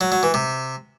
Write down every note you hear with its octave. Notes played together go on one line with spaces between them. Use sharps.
F#3
F#3
E3
C3